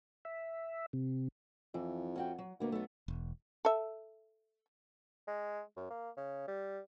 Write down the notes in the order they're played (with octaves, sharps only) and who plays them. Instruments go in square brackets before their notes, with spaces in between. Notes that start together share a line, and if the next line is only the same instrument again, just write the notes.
[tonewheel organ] E5
C3
[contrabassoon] F2 [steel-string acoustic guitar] E3
[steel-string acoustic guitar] C#4 F#4 G5
F#3
[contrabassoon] D2 [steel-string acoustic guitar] A#3 B3
[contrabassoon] B1 [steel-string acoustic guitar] A3 B3
[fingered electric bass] E1
[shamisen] A4 E5
[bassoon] G#3
F#2
A#3
C#3
G3